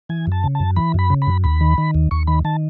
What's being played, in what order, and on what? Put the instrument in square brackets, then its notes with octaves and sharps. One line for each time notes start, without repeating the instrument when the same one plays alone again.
[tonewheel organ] E3 G#5
F#2 A5
C#3
A5
F#2
E3 B5
F#2 B5
C#3
B5
F#2
D#2 B5
D#3
D#3
D#2
D#2 C#6
D#3 B5
D#3 A5